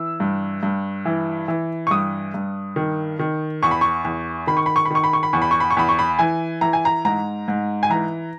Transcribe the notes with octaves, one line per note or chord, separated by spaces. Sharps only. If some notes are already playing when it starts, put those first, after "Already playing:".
Already playing: E3 E6
G2
G2
E3
E3
C#6
G2 D#6
G2
D#3
D#3
E2 C#6
B5
C#6
E2
D#3 B5
C#6
B5
C#6
B5
D#3 C#6
B5
C#6
B5
E2 C#6
B5
C#6
B5
C#6
E2 B5
C#6
B5
E3 G#5
E3 A#5
G#5
A#5
G#2 A#5
G#2
G#5
E3 A#5